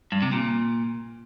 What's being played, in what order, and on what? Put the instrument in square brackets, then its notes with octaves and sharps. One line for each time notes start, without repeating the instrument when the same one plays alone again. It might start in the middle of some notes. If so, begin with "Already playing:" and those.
[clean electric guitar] G2
C3
A#2